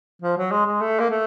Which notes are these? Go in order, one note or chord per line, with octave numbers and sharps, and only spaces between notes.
F3
F#3
G#3
G#3
A3
A#3
A3